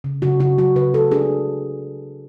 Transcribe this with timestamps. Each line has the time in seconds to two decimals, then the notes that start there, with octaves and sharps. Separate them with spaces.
0.04 C#3
0.22 C#3 F#4
0.40 C#3 F#4
0.58 F#3 F#4
0.76 C#3 B4
0.94 C#3 A4
1.12 D4 G#4